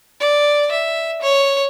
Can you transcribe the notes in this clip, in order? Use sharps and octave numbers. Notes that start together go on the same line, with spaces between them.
D5
E5
C#5